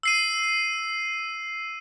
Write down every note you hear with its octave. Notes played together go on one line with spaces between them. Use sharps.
E6 C7 D#7